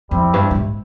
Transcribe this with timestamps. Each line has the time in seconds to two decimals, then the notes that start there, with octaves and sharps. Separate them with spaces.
0.11 F2 G3 C4 E4
0.33 G2
0.51 G2
0.55 G#2